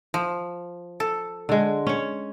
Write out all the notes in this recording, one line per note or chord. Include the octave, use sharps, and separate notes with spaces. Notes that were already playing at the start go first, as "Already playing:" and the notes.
F3
A4
D3 G#3
C#4 C#5